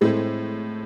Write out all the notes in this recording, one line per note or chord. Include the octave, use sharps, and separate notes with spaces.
A2 G#3 C4 E4 A4 C5